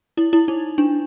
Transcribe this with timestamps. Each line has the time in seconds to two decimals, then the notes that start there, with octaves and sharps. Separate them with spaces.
0.17 E4
0.33 E4
0.48 D#4
0.78 D4